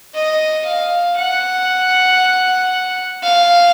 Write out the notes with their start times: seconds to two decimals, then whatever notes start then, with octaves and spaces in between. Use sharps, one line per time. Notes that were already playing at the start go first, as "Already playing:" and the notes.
0.14 D#5
0.65 F5
1.17 F#5
3.23 F5